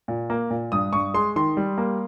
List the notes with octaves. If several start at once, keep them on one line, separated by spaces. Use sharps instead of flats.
A#2
A#3
A#2
G2 D#6
G2 C#6
G#3 C6
D#3 C6
G3
A#3